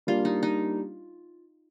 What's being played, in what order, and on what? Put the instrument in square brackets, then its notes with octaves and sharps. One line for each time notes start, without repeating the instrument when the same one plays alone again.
[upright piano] G3 A#3 D4 [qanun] F4
[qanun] D#4
D#4